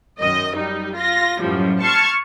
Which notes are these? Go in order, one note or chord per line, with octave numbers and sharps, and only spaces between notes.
F#2 D#3 D#5
G3 D#4
F4 A#6
F#2 A2 F3 G3
A5 C6 C#6 F6 G#6